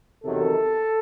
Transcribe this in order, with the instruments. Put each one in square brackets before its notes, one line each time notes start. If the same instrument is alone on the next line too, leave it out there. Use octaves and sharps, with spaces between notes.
[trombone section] E2 C3 D#3 F#3 A4